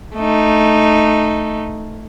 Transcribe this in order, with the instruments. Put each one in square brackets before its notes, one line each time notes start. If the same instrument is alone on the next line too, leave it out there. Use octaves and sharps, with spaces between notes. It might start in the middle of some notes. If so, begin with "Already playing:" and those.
[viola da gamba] A3 D#4